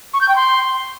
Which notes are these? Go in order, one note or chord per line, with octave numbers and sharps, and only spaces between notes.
C#6
G6
G5
C6